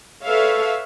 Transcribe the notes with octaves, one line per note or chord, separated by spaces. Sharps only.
A4 B4 C#5 E5 F5